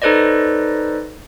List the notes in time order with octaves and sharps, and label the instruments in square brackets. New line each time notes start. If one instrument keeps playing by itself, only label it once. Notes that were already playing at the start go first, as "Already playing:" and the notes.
[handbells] D#4 A4 B4 C5 D5 D#5